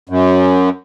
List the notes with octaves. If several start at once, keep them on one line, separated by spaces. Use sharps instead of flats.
F#2